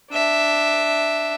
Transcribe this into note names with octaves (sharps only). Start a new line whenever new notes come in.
D4 E5